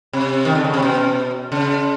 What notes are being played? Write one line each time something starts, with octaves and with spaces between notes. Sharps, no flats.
C3
D#3
D3
C#3
C3
B2
C#3